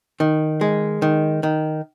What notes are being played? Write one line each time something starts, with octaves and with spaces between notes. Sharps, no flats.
D#3
G#3
D#3
D#3